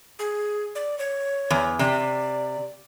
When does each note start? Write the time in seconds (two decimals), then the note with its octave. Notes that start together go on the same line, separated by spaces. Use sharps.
0.19 G#4
0.75 D5
0.99 C#5
1.51 E2
1.79 C3 D5